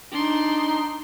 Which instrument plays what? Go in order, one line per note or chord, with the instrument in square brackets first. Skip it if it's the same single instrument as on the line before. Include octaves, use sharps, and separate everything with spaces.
[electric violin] D4 C6 [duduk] D#4